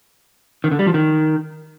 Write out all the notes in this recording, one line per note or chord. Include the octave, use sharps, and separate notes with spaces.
D#3
D3
G3
F3
D#3